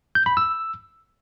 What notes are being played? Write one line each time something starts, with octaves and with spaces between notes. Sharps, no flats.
G6
B5
E6